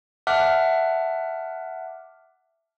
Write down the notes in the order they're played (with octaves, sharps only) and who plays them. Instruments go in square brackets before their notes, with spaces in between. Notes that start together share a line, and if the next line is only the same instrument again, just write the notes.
[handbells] E5 F#5 A5 D6 F6 F#6